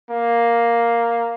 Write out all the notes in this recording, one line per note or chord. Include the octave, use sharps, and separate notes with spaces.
A#3